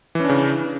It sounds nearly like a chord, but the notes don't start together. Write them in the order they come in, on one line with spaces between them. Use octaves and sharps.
E3 C#4 D4 C#3